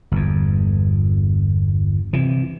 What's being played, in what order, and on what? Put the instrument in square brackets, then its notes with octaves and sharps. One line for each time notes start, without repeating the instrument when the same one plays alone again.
[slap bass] G1 E2
C3 E3